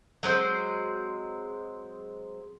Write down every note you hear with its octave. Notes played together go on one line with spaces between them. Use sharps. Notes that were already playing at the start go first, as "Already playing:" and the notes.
F#3 G#3 C4 C5